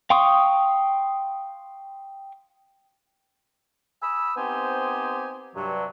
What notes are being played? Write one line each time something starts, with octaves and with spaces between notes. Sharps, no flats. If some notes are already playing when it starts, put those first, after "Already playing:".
F5 G5 C6 C#6 D#6
G#5 B5 D#6 E6
B3 C4 D#4 G4 C5 G#5
G2 C3 F#3